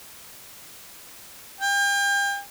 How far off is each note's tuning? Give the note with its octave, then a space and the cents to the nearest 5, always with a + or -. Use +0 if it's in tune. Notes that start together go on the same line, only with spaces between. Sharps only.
G5 +35